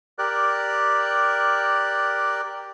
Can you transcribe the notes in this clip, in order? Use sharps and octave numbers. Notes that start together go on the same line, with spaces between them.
G4 A#4 D5 F#6